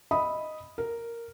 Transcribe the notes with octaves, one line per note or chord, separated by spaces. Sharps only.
D#5 E5 B5 D#6
A#4